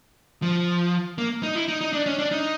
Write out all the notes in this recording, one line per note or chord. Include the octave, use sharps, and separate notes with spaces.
F3
A#3
D#4
E4
D#4
D#4
D4
C#4
D4
D#4